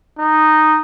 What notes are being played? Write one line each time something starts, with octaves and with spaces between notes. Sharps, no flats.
D#4